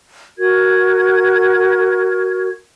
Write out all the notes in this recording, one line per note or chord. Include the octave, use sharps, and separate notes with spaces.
F#4 A#4 G#6